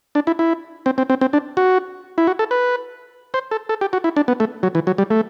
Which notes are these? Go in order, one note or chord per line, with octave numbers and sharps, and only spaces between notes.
D4
E4
E4
C4
C4
C4
C4
D4
F#4
E4
F#4
A4
B4
C5
A4
A4
G4
F#4
E4
D4
B3
A3
F#3
E3
F#3
G3
A3